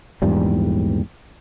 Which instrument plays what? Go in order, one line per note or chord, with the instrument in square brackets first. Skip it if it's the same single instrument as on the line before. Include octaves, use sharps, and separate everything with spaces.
[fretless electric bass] A#1 E2 G#2 G3